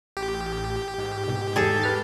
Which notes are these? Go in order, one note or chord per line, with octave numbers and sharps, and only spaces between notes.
A1 G4
G#2
C2 B2
E2 G3 G#4 A4
B4 F6 A6